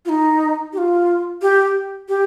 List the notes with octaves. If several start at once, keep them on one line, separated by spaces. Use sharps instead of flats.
F4
D#4
G4
F4
G4
G4